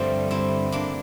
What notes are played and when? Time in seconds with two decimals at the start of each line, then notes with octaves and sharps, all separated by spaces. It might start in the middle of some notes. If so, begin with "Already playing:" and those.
Already playing: G2 D3 F3 G3 A3 C4
0.31 C4 E4
0.72 A#3 D4